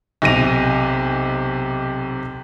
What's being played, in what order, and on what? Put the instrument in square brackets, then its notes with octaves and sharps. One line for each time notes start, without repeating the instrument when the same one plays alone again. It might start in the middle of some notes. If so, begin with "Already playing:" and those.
[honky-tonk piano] B1 C3 A#6 D#7 F7